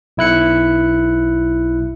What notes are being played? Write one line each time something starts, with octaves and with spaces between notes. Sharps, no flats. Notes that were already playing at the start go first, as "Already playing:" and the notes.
B1 E4 F#6 C#7